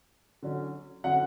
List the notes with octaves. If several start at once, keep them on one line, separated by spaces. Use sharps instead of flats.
D3 F#3 C#4
D3 F#3 C#4 F#5